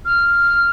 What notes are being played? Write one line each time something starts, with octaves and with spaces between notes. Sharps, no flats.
F6